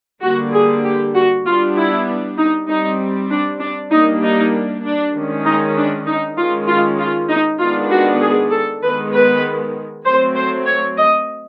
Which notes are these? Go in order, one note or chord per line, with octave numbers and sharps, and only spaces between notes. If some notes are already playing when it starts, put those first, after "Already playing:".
D3 G3 A#3 D4 F#4
G#4
G4
F#4
G3 B3 D4 F4
E4
D#4
G3 C4 D#4
D4
D4
G3 A#3 D4 D#4
D#4
D4
D#3 G#3 C#4
D#4
D4
D#4
D#3 G#3 C#4 F4
F4
F4
D#4
D#3 G#3 B3 D4 F4
F#4
G#4
A4
D#3 G#3 B3 B4
B4
F#3 A3 C4 C5
C5
C#5
D#5